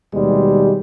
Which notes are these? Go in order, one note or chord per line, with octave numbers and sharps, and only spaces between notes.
D#2 B2 G3 G#3